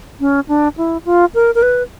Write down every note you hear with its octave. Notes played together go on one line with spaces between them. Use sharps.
C#4
D4
E4
F4
A#4
A#4
B4